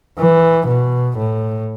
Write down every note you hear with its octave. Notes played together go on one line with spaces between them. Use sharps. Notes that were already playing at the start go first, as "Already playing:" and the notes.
E3
B2
A2